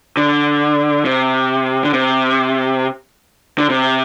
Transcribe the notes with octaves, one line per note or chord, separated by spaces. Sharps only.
D3
C3
D3
C3
D3
C3